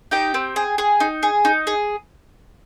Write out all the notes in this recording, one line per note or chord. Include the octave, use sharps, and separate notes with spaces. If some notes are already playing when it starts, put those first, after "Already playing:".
D#4 G4 G5
C4
G#4
G#4
D#4
G#4
D#4
G#4